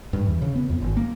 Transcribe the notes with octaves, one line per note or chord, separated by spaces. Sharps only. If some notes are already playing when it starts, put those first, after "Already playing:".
G2
E2
C#3
B3
F2
G#1
A#3